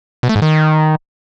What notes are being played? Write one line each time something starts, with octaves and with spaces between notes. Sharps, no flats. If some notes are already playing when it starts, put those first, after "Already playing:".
B2
A3
G#2
D#3